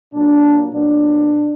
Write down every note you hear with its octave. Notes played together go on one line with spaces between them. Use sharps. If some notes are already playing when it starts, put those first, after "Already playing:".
A#2 F#3 A#3 D4
A#2 F#3 B3 D4